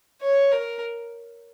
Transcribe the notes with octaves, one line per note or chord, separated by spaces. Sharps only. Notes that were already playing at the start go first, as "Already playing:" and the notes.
C#5
A#4